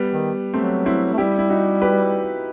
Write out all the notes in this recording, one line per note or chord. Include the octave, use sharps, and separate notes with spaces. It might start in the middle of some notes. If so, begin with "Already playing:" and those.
Already playing: G3 B3
D#3
F#3 A3 C4
C4 E4
A3
G3 E4 G4
E4
D#4 F#4
G4 B4